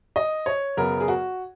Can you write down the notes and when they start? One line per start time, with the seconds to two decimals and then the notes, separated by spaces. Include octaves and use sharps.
0.16 D#5
0.46 C#5
0.77 F#2 C#3 F#3 B3 A#4
1.00 G#4
1.08 F#4